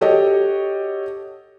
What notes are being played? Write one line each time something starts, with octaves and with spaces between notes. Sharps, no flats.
F#4 G4 A4 C#5 D#5